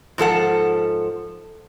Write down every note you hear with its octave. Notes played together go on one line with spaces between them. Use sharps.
G#2 F3 A4 F#5